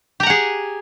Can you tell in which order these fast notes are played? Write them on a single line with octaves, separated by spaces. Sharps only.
G4 A#5 F#5 G#4